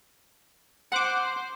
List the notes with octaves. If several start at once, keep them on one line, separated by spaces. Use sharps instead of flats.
C5 F#5 D6